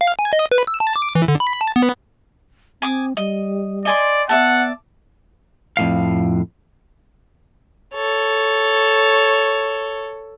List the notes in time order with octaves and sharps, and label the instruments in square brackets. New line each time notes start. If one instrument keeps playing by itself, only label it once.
[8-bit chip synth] F5
G#5
D#5
B4
E6
A5
D6
E3
D3
B5
A5
B3
[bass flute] C4 [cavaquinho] G#5 D6 D#6
[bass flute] G3 [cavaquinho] D#5
[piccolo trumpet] D5 [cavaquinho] D#5 G#5 C6
[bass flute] B3 [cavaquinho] D5 E5 A5 [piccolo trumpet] F#5
[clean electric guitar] F2 A2 F5
[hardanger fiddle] A4 C#5